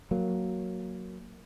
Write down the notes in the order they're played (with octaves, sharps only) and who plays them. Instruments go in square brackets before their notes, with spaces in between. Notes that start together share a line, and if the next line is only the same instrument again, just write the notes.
[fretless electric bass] F#3 A#3